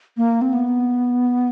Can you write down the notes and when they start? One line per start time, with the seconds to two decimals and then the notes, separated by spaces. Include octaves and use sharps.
0.17 A#3
0.41 C4
0.53 B3